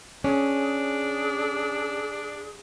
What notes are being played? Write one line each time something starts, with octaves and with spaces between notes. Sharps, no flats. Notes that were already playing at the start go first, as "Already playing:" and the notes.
C#4 D4 G#4